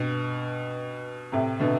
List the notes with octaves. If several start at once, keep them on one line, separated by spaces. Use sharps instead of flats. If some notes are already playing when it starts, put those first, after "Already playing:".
Already playing: G2 B2
A2 C3
B2 D3